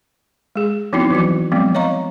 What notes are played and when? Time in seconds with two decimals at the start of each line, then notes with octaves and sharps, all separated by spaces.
0.56 G#3 G#4
0.93 F3 B3 C4 D#4 E4 F#4
1.10 E3 F#3 F#4
1.52 F3 F#3 G#3 B3 C4
1.75 C#5 D#5 F5 A#5 C#6